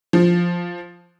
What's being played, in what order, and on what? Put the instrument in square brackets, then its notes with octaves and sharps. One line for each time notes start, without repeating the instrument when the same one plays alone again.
[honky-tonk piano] F3